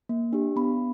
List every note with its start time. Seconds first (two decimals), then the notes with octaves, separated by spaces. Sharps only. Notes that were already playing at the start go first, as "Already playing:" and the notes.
0.09 A#3
0.33 D4 G4
0.56 B3 B5